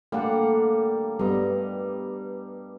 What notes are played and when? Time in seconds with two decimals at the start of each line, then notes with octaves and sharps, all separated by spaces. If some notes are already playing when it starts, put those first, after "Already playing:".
0.12 D3 G3 A3 A#3 F5 F#5
1.19 G2 G3 B3 D#5 A#5